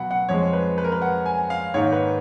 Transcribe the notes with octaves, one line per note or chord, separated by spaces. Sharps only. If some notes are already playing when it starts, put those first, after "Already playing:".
Already playing: B2 F#3 F#5 B5
F#5
F2 F3 G#3 C#5
B4
B4
A#4
B4
F#5
G#5
F5
G#2 D#3 A#3 C#5
B4